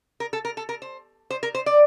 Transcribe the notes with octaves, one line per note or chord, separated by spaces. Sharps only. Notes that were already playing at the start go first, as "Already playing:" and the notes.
A#4
A4
A#4
A4
A#4
C5
C5
A#4
C5
D5